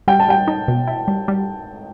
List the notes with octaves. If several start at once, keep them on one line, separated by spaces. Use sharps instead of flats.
G3 G5
A5
G3 G5
D#4
B2
E4
G3
G3